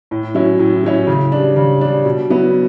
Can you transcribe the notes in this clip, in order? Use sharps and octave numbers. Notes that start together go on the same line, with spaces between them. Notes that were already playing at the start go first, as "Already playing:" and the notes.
A2
F#3 C#4 E4
A2
F#3 C#4 E4
C#3
G3 D4
C#3
G3 D4
B2
F#3 B3 E4